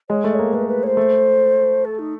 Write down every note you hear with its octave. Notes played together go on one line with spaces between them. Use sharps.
G#3 C#5
A3
D#5
A#3 C#5
A3 B4
B4
C#5
C5
A3
A4
D#4